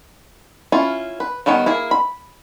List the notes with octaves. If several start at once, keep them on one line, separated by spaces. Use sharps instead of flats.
C#4 E4 F4
B4
D#3 G3 B3 C#5
A#3 E4 G#4
B5